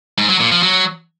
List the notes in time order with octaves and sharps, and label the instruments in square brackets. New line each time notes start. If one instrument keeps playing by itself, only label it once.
[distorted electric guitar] G#2
F#3
A#2
F3
F#3